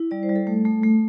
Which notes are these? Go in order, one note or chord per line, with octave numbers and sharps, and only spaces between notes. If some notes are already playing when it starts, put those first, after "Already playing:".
Already playing: E4
G3 D5
C5
G3
A4
A3
A3
A3